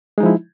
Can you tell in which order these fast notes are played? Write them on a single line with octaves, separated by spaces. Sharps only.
G#3 D#4 F3 E4